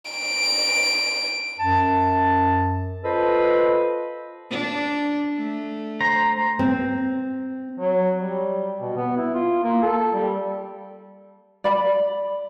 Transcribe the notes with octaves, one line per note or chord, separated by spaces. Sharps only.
D7
F#2 A5
F4 A4 B4 C5 D#5
D4
A3
C5 A#5
C4
F#3
G3
B2
B3
E4
F4
A#3
A4
G3
D5 B5